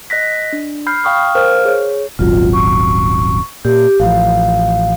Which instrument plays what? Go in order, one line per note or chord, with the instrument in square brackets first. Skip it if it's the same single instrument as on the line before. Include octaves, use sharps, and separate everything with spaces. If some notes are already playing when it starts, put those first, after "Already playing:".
[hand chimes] D#5 F#6 A#6 B6
D4
B5 F6 G6 C7
F5 G5 C#6 D#6 F6
A#4 C5 F5 F6
G#4 C#5
[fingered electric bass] D#1 G#1 F#3 [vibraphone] F4
[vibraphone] C#6
[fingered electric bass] A#2 [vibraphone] G4
[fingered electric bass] A1 F3 [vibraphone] F5